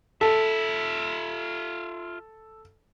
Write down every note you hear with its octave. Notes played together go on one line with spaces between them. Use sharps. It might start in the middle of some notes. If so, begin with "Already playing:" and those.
F4 A4 E5